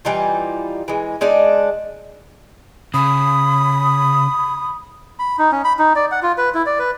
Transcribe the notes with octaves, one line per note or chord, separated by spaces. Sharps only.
E3 G3 D#4 F4
E3 G#3
G#3 D4 D#4 D5
C#3 B5 D#6
B5
D#4
C#4
B5
D#4
D5
F#5
F4
B4
E4
D5
B4